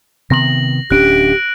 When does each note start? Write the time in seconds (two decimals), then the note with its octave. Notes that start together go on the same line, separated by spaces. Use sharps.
0.30 C3 D#3 B3 A#6 F#7
0.91 D1 C#4 D4 G4 F#6 D7